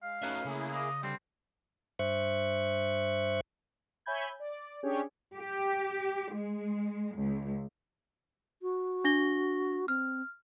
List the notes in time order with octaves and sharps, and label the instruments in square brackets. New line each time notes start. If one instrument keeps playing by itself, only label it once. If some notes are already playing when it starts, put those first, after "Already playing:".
[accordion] G#3 [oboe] F5
[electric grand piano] A3 C#4 F#6 [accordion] D#4 B4 [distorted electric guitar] F#4 E5
[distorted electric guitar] C#3 [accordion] A#3 E4 G#4
[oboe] D#5 [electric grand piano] F5 D6
[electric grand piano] D3 G3 [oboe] C4
[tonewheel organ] G2 C5 E5 C#6 F#6
[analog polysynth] C#5 E5 G#5 B5 G6 G#6
D5
C#4 D4 G4 G#4 C#5 G5
[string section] G4
G#3
C#2
[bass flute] F#4
[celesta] D4 A#6 G7
[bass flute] C4 [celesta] F6